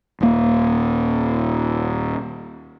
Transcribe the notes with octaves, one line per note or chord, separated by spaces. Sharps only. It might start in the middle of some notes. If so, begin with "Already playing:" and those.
D#1 A#3